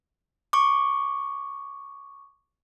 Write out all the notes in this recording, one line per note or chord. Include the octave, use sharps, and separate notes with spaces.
C#6 D6